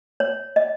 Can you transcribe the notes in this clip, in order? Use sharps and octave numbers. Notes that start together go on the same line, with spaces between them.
C#5
D#5